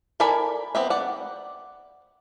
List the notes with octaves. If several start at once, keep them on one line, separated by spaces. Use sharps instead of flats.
A4 A#4 D5 G#5 B5
B3 C4 E5
D5 F#5